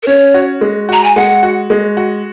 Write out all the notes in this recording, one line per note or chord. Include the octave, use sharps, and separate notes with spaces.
A#4
C#4 C#5
F#4
G#3
F#4 A#5
G#5
G#3 F#5
F#4
G#3
F#4